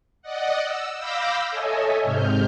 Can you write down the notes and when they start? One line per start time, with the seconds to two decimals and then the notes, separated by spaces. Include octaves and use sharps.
0.22 D5 D#5 F#5
0.63 E6
0.97 F5 B5 D6 E6 G6 A#6
1.51 A4 C#5 D#5 E5 G#5
2.04 G#2 C3 F6 G6